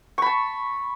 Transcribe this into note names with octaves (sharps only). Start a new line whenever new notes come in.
A5 B5 C#6